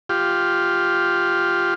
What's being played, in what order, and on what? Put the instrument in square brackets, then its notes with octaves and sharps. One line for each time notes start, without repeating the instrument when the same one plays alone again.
[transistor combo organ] F4 G4